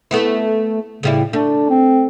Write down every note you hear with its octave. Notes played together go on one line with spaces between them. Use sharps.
A3 B3 E4
A2 C#3 G3 E4
A3 D4
C4